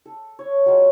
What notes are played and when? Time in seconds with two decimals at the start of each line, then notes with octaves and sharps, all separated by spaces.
0.06 A4
0.39 C#5
0.66 F#3 G#3 F4 G#4